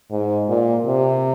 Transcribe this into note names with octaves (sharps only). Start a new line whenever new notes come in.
G#2
A#2
C3